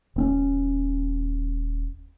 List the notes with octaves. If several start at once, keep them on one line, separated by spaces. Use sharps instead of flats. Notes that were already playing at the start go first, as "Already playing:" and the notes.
D#1 C4 C#4